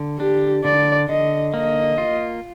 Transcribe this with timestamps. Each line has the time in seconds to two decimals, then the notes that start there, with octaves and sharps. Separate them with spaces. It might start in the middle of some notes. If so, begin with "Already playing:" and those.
Already playing: D3
0.19 D4 G4
0.64 D3 D5
1.09 D3 D#5
1.54 A#3 D#5
1.98 F4